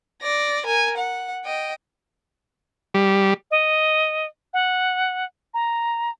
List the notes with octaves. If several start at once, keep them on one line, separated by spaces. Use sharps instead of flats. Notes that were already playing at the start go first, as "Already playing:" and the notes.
D5 A#6
A#4 G#5
F#5
D#5 G5
G3
D#5
F#5
A#5